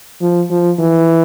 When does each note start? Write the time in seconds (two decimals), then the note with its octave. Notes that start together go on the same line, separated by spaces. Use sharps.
0.21 F3
0.51 F3
0.79 E3